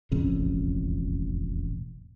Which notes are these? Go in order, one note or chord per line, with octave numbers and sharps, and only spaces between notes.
E1 A1 F2 C#3